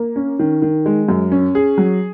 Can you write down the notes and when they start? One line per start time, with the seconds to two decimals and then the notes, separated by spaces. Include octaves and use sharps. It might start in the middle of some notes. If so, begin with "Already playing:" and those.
Already playing: A#3
0.16 C#4
0.39 D#3
0.62 D#3
0.86 G#3
1.09 F#2
1.32 C#4
1.55 G#4
1.78 F#3